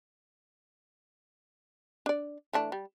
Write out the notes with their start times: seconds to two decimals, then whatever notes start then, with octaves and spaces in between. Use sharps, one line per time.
2.06 D4 D5
2.53 E3 A3 D4
2.72 G3